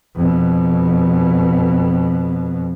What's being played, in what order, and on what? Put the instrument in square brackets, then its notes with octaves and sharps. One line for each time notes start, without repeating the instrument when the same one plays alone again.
[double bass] F2 B2